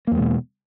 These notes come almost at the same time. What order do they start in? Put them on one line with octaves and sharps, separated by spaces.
A#3 E2 G#3 B2